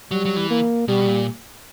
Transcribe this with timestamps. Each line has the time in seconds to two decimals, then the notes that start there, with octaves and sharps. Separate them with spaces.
0.11 F#3 G3
0.26 F#3
0.37 E3
0.50 A#3
0.88 B2 G3
1.07 A#2